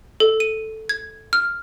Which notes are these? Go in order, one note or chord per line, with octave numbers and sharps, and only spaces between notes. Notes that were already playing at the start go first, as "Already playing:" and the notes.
A4
D#7
G#6
F6